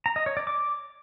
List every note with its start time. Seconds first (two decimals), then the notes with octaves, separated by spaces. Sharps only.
0.06 A#5
0.16 D#5
0.26 C#5
0.37 D5
0.47 D6